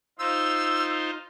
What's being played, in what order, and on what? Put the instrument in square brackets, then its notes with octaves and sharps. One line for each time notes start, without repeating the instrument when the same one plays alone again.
[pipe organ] D#4 F4 C5 [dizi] E6